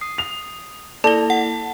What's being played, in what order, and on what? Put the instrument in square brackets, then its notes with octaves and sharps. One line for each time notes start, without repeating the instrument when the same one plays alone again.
[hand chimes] D#6 C7
[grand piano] F7
[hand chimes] A#3 E4 A#6 [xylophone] A4 G7 [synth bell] D5 [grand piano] A5
[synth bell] F#5